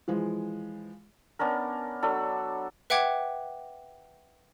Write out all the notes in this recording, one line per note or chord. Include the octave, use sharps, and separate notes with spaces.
E3 F3 G#3
B3 C#4 D4 A#4
F#3 D4 A4 B5
B4 E5 F#5 G5 D6 G#6